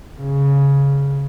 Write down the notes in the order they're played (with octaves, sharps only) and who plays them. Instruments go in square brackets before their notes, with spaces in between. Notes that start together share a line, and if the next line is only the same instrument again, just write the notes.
[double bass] C#3